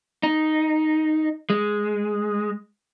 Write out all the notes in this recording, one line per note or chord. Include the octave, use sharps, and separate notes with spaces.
D#4
G#3